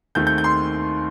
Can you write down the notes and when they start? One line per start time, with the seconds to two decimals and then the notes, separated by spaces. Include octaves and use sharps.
0.15 D#2 D#3 A3 C4 G6
0.27 G6
0.38 G6
0.44 C6